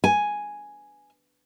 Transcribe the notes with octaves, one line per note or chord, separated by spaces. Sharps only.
G#5